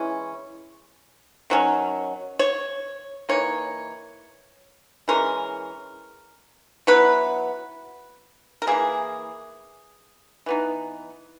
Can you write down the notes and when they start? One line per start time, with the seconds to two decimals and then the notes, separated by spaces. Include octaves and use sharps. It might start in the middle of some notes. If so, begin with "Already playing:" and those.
Already playing: E3 G#3 C#4 E4
1.50 D#3 F#3 C#4
2.39 C#5
3.29 E3 A#3 D#4 C#5
5.08 E3 G#3 C#4 A#4
6.87 F#3 B3 E4 B4
8.62 A#4
8.67 E3 A#3 E4 G#4
10.46 E3 B3 D#4